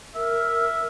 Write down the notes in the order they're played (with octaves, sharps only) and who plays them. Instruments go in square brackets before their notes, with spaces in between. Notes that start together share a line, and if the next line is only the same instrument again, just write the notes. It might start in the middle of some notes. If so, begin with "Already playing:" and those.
[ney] A#4 [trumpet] E5